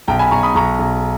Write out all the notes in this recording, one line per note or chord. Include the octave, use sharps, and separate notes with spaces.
B1 G5 A#5
G#5 B5
B1 A#5 C#6
B5 D#6
B1 A#5 C#6
B1